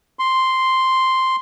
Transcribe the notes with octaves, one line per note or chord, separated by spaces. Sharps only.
C6